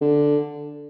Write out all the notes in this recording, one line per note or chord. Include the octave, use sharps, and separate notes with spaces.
D3